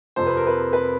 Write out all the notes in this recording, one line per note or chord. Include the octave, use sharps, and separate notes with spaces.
F2 C3 F3 C5
B4
A#4
B4
B4